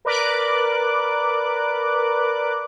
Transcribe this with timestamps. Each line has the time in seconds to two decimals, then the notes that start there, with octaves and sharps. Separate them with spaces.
0.05 A#4 B4 D5 D6 F#6